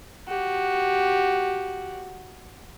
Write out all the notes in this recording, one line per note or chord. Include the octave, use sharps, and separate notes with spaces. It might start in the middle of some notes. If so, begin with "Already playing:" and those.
F#4 G4